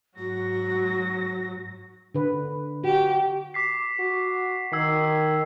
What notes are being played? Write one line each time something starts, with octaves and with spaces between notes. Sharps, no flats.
G#2 F#3 F#4 A#6
D3 B4
F#4 G4
D6 B6 C7
F#4
D#3 E6 G#6 C7